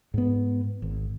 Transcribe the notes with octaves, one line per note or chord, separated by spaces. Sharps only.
G#2 B3
G#1